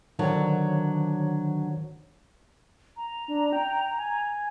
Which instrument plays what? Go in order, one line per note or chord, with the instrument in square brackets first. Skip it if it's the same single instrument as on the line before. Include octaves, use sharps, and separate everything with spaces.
[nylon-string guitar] D3 F#3 [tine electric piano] D#3 C5 C#5
[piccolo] A#5
[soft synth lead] D4
G5
G#5